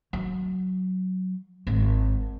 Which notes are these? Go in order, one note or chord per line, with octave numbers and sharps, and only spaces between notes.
F#3
G#1 G#2